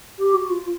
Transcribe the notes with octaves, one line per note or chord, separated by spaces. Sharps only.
G4
F#4
F4